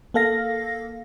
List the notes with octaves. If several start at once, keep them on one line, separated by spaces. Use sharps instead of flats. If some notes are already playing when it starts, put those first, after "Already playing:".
A#3 A4 F5 A#6